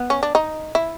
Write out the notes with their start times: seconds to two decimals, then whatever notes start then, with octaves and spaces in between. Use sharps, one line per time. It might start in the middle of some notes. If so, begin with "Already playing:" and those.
Already playing: B3
0.10 C#4
0.23 D4
0.35 D#4
0.75 E4